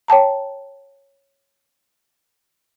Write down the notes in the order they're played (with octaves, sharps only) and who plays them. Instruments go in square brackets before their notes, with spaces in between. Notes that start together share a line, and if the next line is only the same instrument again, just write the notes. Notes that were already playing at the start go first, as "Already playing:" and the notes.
[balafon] C#5 G5 A5 A#5